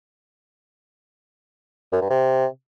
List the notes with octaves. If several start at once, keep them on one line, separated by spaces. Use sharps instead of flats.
F#2
G2
C3